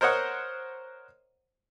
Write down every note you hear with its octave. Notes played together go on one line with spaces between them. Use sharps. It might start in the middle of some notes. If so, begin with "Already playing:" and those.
A#4 C5 C#5 D#5 F#5